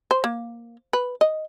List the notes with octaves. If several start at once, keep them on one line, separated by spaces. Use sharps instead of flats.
C5
A#3
B4
D#5